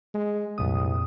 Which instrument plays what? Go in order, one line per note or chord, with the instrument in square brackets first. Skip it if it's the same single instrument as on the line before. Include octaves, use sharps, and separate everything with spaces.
[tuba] G#3
[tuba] C2 [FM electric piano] F2 A#2 D#6